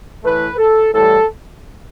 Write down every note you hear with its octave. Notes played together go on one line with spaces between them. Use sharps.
A2 E3 A3 B4
A4
A2 E3 G3 A4